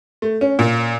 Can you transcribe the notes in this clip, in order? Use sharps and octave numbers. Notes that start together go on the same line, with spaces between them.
A3
C#4
A#2